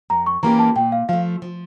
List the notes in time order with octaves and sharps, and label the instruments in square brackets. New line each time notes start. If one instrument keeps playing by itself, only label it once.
[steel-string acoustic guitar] F2 [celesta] A#5
[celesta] C#6
[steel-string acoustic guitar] E3 A#3 C#4 G4 [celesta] A#5
[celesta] A5
[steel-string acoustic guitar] A#2 [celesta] G5
[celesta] F5
[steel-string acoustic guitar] F3 A3 [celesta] F5
[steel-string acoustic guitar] F3